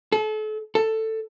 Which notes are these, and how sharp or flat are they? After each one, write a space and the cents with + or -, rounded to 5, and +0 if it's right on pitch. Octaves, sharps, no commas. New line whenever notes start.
A4 -35
A4 +10